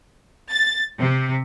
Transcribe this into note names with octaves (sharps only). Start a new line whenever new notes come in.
A6
C3